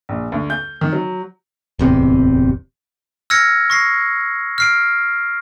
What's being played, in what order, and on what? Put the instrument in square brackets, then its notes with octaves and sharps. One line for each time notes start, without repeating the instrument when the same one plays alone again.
[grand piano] A#1
D2
G6
D#3
F#3
[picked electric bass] D1 E2 C3
[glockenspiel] E6 F6 G#6 A#6 C#7
C#6 A#6 C7
F6 C7 D7